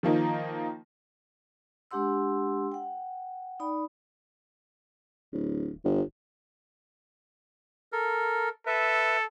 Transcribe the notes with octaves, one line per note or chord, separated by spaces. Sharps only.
D#3 F3 A#3 D#4
G#3 D4 G4 F#5 C6 E6
F#5 G5
D#4 D5 B5
D1
G1
A4 A#4
A4 B4 E5